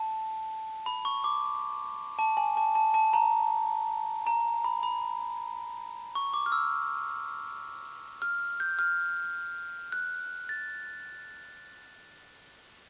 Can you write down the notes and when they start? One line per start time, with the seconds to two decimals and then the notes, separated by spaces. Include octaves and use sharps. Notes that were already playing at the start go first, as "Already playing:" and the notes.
Already playing: A5
0.86 B5
1.05 C#6
1.24 D6
2.19 A5
2.37 G#5
2.57 A5
2.75 A5
2.94 A5
3.13 A#5
4.27 A#5
4.64 B5
4.83 B5
6.15 C#6
6.34 D6
6.46 F6
6.52 E6
8.22 F6
8.60 G6
8.79 F6
9.92 F#6
10.49 A6